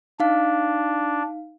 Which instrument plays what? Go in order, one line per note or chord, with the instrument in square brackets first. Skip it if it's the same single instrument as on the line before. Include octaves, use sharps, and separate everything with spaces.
[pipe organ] D4 [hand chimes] D#4 F5